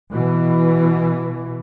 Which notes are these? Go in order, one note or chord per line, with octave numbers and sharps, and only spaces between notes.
B2 E3